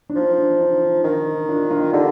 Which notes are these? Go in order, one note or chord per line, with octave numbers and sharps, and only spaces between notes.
D4
F3 D#4
D4
D#4
D#4
D#3 D4
D#4
D4 F4
D4 F4
D3 D#4 G4